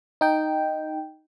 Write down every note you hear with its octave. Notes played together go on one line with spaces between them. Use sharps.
D#4 G5